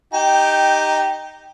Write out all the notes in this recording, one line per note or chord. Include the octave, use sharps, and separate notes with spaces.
D#4 G4 G5